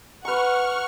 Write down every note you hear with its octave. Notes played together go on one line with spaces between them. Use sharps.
B4 F#5 A#5 C#6 F6